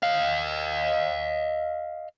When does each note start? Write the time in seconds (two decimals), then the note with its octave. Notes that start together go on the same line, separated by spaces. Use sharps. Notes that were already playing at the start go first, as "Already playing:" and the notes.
0.03 D#5 F5